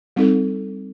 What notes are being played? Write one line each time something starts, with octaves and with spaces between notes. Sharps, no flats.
G3 C4 D#4 A4